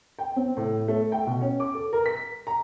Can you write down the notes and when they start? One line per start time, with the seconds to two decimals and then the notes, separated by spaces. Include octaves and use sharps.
0.19 G5
0.36 C4
0.57 A2
0.88 A3
1.12 G5
1.27 B2
1.41 C#4
1.60 D6
1.75 A4
1.93 A#4
2.06 B6
2.47 A#5